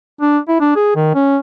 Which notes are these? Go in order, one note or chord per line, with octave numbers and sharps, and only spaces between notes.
D4
E4
D4
G#4
D#3
C#4